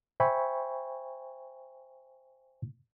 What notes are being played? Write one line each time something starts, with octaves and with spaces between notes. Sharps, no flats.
C5 E5 G5 G#5 B5 C#6